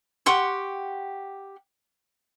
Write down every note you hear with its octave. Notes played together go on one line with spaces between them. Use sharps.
G4 F#5 C6 C#6